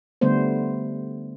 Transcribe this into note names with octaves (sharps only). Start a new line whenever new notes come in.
D3 G3 A3 B3 C5